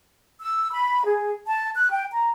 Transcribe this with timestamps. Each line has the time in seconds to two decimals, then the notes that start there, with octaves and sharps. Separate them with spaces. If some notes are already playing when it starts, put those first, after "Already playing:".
0.41 E6
0.72 B5
1.05 G#4
1.47 A5
1.76 F#6
1.91 G5
2.12 A#5